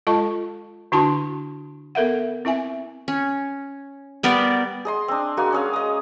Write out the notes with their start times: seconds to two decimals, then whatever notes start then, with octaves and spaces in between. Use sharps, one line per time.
0.07 G#3 F4 A4 D#5 A5 C#6
0.92 D3 D4 E4 F#4 A5 C6
1.95 B3 A4 A#4 E5 F#5
2.45 C4 E4 E5 G#5
3.08 C#4
4.23 G3 B3 A#4 D5
4.85 G#4 D#5 C6
5.08 C4 D4
5.37 G#3 A#3 F#4 G#5
5.52 C#4 G#4 F5
5.73 D#5 D#6